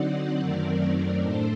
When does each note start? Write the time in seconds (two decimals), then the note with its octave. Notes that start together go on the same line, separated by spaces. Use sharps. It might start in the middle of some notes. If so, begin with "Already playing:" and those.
Already playing: D3 F#3 C4 D#4 D5 F#5
0.39 F#2 D#3 F#3 A3 C4 A#4 D5
1.22 A2 A3 D4 A4 C5